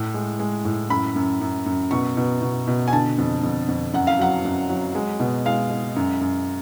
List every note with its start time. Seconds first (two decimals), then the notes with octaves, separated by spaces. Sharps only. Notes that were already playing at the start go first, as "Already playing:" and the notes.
Already playing: A2
0.14 G#3
0.39 G#3
0.65 A2
0.90 F#2 B5
1.16 F#2
1.41 F#2
1.66 F#2
1.91 B2 C#6
2.17 B2
2.41 B2
2.67 B2
2.88 G#5
2.93 D3 A5
3.18 F2
3.43 F2
3.68 F2
3.93 F#2 F#5
4.07 F5
4.19 F#3 F#5
4.45 F#2
4.69 F#3
4.95 G#3
5.20 B2
5.45 G#3 F5
5.70 G#3
5.96 F#2
6.21 F#2